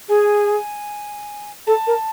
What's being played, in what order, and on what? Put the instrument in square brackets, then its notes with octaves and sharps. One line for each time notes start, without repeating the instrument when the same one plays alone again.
[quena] G#4 [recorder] G#5
[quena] A4 [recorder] A5
[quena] A#4